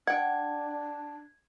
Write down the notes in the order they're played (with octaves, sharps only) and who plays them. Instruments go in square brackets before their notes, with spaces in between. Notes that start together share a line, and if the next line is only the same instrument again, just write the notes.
[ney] D4 [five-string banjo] F#5 G5 [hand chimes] G#6